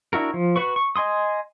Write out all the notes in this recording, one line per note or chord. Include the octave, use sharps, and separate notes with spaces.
D4 E4 F#4 A#4
F3
F#4 B4 C#6
C#6
D#5 G#5 C6 D#6